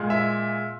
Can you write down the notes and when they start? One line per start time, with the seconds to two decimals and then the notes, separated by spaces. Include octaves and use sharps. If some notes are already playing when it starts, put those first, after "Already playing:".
Already playing: A#2 G#3
0.10 E5